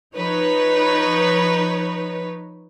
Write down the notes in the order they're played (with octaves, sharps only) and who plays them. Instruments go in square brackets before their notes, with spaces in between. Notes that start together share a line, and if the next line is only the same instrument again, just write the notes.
[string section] F3 D#4 B4 C#5